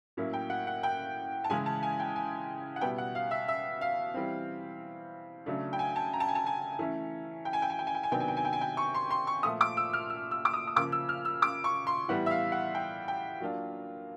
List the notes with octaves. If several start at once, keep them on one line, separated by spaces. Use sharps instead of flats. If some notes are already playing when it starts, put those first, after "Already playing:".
A2 F#3 A#3 C#4 E4
G5
F#5
F#5
G5
A5
C#3 E3 G#3 C#4 E4 G#5
A5
G#5
G5
G#5
F#5
B2 G3 B3 E4 G5
F#5
F5
E5
E5
F5
E3 G3 C4
C#3 F#3 A3 D4
G5
G#5
A5
A#5
A5
G#5
A5
G#5
E3 A3 C#4
G5
G#5
G5
G#5
G5
G#5
G5
G#5
C3 D#3 F#3 B3 D4 G5
G#5
G5
G#5
G5
G#5
G5
C#6
C6
C6
C#6
A#2 F3 A3 D#6
D6
E6
F6
E6
E6
D6
D#6
D#6
C#3 F3 A#3 D6
E6
F6
E6
D6
C#6
C6
A2 E3 G3 B3 F#5
E5
F5
F#5
G5
G5
F#3 A#3 D4 F4